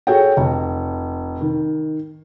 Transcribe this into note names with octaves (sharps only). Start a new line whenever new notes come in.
F#4 G#4 A4 C#5 G5
F1
D#3